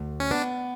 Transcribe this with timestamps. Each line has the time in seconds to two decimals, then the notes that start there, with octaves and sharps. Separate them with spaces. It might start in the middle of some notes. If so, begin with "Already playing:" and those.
Already playing: D2
0.20 C#4
0.31 B3 D4